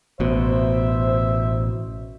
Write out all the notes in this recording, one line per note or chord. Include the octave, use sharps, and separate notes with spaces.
A1 B2 C5 E5